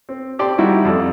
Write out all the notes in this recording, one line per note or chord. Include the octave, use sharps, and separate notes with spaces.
C4
C4 G4 D5 A5 C6
G3 D#4 E4 F#4
F2 A4 D5